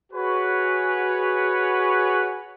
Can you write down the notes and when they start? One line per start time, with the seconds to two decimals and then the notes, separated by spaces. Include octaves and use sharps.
0.13 F#4 G#4 B4 C#5